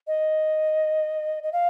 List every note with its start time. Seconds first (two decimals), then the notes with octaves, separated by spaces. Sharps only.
0.07 D#5
1.43 D#5
1.53 F5